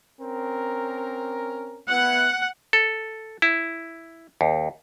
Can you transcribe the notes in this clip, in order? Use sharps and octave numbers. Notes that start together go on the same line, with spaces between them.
C4 C#4 A#4
B3 E4 F#5
A4
E4
D#2